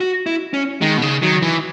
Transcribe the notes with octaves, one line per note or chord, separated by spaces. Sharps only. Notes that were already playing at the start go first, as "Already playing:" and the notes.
F#4
E4
C#4
D#3 G#3
B2
C#3
D#3 F#3
E3